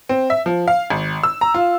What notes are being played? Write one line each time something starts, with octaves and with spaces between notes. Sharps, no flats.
C4
E5
F3
F5
G#1
E6
A#5
F4